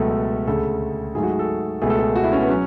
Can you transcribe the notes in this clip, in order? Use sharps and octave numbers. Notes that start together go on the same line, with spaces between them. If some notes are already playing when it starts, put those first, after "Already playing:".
Already playing: C#2 B2 F#3 A3 A4
D2 C#3 G#3 A4
G#2 F#3 A3 G#4
F#4
G#4
A4
C#2 B2 A3 G#4
A4
G#4
F#4
E4
C#4
B3
F#3 C#4